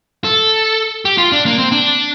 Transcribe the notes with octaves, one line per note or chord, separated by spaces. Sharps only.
A4
G4
F4
D4
A#3
C4
D4